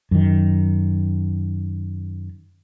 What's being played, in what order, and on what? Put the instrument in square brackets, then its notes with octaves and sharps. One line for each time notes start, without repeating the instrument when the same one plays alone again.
[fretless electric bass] F#2 D#3